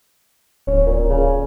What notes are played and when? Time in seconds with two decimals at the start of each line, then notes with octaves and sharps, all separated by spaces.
0.67 D1 C#4
0.86 A#2
1.09 C#3